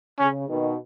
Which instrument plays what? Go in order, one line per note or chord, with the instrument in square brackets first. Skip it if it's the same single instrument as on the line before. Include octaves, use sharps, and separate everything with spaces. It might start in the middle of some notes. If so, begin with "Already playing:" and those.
[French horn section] C#3 [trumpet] C#4
[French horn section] B2 D#3